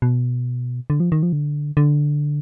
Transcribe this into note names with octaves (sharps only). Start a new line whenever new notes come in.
B2
D3
F3
D#3
F3
D3
D3